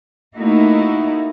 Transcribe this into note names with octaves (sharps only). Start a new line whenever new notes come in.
A3 A#3 D#4 E4 F#4